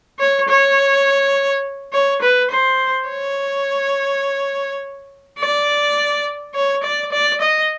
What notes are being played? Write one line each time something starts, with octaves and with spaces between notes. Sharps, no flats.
C#5
C#5
C#5
B4
C5
C#5
D5
C#5
D5
D5
D#5